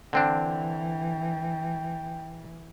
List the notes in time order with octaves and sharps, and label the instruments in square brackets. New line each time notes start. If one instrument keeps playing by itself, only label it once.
[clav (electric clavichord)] D3 C4 D4 [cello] E3 [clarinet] G5